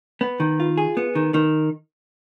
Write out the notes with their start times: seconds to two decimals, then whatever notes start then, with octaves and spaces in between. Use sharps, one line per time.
0.21 B3
0.40 D#3
0.60 F4
0.78 G#4
0.97 B3
1.15 D#3
1.34 D#3